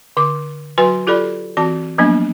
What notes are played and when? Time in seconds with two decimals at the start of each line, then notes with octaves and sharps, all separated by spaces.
0.17 D3 D6
0.78 F#3 F#4 B4 G#5 C6
1.07 F4 G4 A4 D5 B5
1.57 E3 C4 F#4 A5
1.98 F3 F#3 A#3 B3 D4